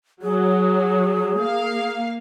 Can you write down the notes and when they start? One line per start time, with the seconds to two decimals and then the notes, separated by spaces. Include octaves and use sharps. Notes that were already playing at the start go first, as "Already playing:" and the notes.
0.22 F#3 G#4
1.39 A#3 F5